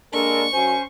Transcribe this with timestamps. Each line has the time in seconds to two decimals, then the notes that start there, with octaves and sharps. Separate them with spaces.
0.14 G#3 A#3 D4 A4 A#4 C#6
0.53 F#2 F#3 C#4 C5 G#5